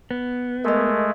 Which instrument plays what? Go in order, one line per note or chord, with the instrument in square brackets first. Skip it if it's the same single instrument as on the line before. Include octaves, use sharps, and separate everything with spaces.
[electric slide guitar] B3
[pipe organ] G#3 A3 [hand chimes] A#4 D#5